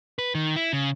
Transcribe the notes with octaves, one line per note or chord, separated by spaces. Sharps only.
B4
D#3
E4
C#3